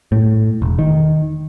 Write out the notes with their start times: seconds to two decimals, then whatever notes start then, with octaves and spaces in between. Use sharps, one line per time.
0.12 A2
0.62 E1
0.79 D#3